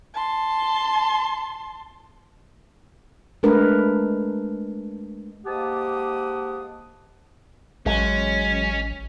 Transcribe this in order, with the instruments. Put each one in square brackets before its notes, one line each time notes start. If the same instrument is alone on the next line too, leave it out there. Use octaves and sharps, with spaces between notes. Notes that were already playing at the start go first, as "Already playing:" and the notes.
[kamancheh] A5 C6
[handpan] G#3 A3 D4 A#4 B4
[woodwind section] G#2 A#3 G4 F#5 A5 D#6
[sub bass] A1 [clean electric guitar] F#3 G#3 [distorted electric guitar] C#4